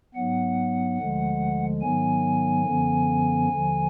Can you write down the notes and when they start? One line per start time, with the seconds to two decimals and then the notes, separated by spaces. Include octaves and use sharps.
0.15 G#2 F#3 B3 F#5
0.97 D2 D3 F3 G#3
1.81 G#2 D#3 F#3 B3 G#5
2.65 F#2 D3 F3 B3
3.49 D#2 D3 F3